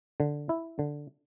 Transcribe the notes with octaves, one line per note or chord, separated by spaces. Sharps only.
D3
E4
D3